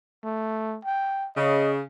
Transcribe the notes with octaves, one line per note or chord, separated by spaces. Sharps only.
A3
G5
C#3 D#5